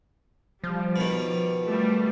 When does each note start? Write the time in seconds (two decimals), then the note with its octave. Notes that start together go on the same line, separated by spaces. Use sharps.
0.64 F3 G3
0.96 B2 D#3
1.66 G3 A3